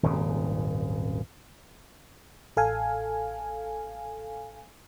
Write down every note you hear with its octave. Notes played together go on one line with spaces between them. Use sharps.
D#1 G#1 F#2 C#3
A1 A4 F5 G#5